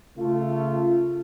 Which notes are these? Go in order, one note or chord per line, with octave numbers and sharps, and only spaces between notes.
C#3 A3 F4